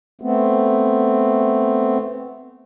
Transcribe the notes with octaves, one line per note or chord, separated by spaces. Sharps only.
A3 B3 C4